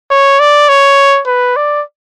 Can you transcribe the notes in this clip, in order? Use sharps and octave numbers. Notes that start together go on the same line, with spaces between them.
C#5
D5
C#5
B4
D5